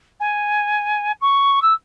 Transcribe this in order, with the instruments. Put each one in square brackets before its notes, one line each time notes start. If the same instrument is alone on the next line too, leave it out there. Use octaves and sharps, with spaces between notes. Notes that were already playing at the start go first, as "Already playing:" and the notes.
[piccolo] G#5
C#6
E6